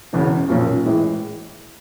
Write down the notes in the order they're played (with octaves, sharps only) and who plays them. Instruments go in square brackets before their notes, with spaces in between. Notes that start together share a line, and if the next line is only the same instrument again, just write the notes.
[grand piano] E1 E2 C#3
B1 A#2 F3 A#3 C#4
A2 E3 G#3